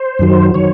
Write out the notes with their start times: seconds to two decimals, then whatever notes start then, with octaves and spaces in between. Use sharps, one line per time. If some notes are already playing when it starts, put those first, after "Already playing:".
Already playing: C5
0.19 F#2 D#3 F#3
0.54 D#3 F#3 C#5